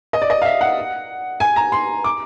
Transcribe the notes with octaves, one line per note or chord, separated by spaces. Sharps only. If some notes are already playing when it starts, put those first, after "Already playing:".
D#5
D5
D#5
F5
E5
F#5
G#5
A#5
C6
D6